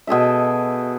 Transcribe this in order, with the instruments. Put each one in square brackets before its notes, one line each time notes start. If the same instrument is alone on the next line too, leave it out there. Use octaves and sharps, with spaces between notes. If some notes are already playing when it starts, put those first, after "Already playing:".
[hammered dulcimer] B2 G#4 A4 E5